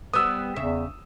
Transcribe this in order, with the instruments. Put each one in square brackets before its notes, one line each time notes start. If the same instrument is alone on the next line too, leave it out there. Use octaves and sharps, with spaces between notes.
[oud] G3 B3 [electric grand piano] D#6 E6
[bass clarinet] E2 [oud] C#3 E5